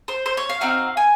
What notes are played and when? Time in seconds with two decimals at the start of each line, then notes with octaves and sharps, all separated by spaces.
0.08 C5
0.26 C5
0.37 C#5
0.49 F5
0.61 C4 D#4 F#4 F5
0.97 G#5